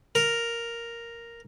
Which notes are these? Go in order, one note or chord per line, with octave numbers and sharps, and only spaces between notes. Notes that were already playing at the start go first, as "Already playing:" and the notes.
A#4